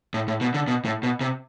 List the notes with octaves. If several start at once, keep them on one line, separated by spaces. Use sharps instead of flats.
A2
A2
B2
D3
B2
A2
B2
C3